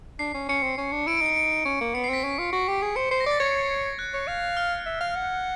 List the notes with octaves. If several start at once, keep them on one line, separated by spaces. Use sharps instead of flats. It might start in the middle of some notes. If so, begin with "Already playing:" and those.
D4 C7
C#4
C#4 C#7
C4
C#4
D4
E4 D7
D7
D#4 C#7
D7
C#4
A#3
B3 C#7
C7
C4 B6
C#4
F4
F#4
G4
G#4
C5 C#7
C5 C7
A#6
D5 A6
C#5 G#6
F#6
C#5
F5
F6
E5
F5
F#5